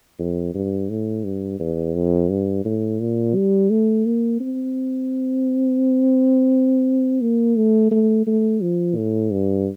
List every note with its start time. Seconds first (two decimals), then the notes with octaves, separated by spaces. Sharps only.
0.20 F2
0.54 G2
0.90 A2
1.25 G2
1.60 E2
1.95 F2
2.30 G2
2.65 A2
3.00 A#2
3.35 G3
3.70 A3
4.06 A#3
4.40 C4
7.21 A#3
7.56 A3
7.91 A3
8.27 A3
8.62 F3
8.97 A2
9.32 G2